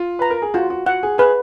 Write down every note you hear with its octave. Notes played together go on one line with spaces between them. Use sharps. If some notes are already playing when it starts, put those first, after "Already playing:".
Already playing: F4
B4 A#5
A#4
G#4
F4 F#4
F#4
F#4 F#5
G#4
G#4 B4